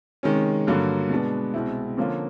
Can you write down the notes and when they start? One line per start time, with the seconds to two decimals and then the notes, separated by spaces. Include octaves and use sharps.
0.23 C3 D#3 G#3 C#4
0.67 G2 D3 F#3 A#3
1.10 B2 G#3 B3 D4
1.54 C2 B2 G#3 C4 E4
1.97 D3 F3 A#3 C#4 F4